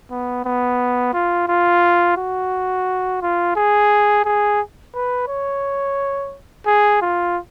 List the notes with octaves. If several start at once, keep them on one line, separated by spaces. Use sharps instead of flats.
B3
B3
F4
F4
F#4
F4
G#4
G#4
B4
C#5
G#4
F4